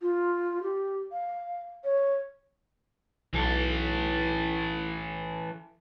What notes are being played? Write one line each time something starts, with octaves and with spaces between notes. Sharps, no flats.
F4
G4
F5
C#5
B1 E3 A4